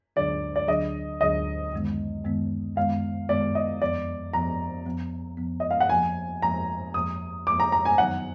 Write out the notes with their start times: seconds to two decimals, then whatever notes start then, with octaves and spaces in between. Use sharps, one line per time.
0.16 D2 D3 F#3 D4 G#4 D5
0.56 D5
0.68 D2 D3 F#3 D4 G#4 D#5
1.21 D2 D3 F#3 D4 G#4 D#5
1.73 F#2 D#3 G#3 B3
2.24 F#2 D#3 G#3 B3
2.77 F#2 D#3 G#3 B3 F5
3.29 F#2 D#3 G#3 B3 D5
3.55 D#5
3.81 F2 F3 B3 D5
4.33 F2 F3 B3 A#5
4.86 F2 F3 B3
5.37 F2 F3 B3
5.60 D#5
5.71 F5
5.80 F#5
5.89 F2 F3 A#3 G#5
6.42 F2 F3 A#3 A#5
6.94 F2 F3 A#3 D#6
7.47 F2 F3 A#3 D6
7.60 A#5
7.72 A#5
7.85 G#5
7.98 F#2 D#3 F#3 B3 D#4 F#5